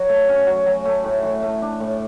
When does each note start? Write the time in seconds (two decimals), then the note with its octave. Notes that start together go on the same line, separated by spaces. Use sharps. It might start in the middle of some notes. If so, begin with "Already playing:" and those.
Already playing: F#3
0.09 A3
0.29 C#4
0.47 F#3
0.66 F#3
0.85 A3
1.04 A2
1.23 E3
1.43 A3
1.62 D4
1.80 A2